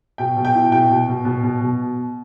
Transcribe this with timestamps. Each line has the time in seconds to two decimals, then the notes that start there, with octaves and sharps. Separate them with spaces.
0.18 B2 G5
0.36 B2
0.45 G5
0.55 E4
0.72 B2 G5
0.90 B2
1.08 B2
1.25 B2
1.43 B2
1.61 B2